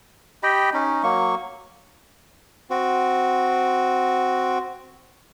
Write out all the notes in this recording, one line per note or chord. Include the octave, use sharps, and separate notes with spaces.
G4 D#5 G5 B5
C#4 D#4
F#3 A#3 C#6
C4 F#4